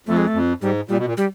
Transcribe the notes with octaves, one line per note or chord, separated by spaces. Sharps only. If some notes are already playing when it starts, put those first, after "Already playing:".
F2 A3
G#3
A3
F2
G#2 G3
A#2 G3
B2
A#2
G3